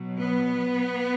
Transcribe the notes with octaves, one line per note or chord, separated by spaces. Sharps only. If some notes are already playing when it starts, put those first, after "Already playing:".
Already playing: B2 F#3
B3